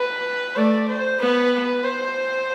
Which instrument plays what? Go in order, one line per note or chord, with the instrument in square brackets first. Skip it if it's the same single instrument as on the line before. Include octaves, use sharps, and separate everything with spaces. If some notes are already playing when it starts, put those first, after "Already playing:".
Already playing: [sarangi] B4
[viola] A3 [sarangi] D5
[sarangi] C5
[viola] B3 [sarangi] B4
[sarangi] C5